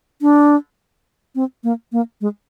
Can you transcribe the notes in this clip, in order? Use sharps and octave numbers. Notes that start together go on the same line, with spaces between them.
D4
C4
A#3
A#3
G#3